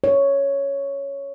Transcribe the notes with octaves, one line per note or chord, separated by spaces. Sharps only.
C#5